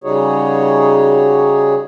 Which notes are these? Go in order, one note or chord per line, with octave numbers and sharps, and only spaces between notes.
C#3 G3 D#4 F#4 G#4 C#5